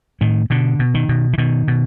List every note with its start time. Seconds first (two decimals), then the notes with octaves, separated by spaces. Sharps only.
0.21 A2 D#3
0.50 B2 D3
0.79 B2
0.94 D#3
1.09 B2
1.33 E3
1.38 B2 D#3
1.68 B2